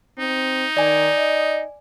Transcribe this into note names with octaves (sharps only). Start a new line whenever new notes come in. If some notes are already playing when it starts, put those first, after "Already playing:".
C4 D#4
D#3 D5 G#5
D#5